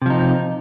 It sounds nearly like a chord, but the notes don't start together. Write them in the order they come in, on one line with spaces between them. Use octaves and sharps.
C3 F3 D#4